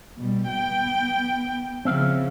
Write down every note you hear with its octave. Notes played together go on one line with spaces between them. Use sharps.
B2 G3
B3 G5
C#3 F3 C4 E5 F5